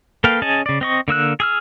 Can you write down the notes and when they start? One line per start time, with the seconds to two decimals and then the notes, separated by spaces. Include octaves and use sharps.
0.24 A#3 A4 B4 F5 G5
0.42 C#4 G#4 D#5 G#5 A5
0.66 C#3 D5
0.81 C4 D#5 C#6
1.08 D3 A#3 E6 F#6
1.40 G#4 E6 F6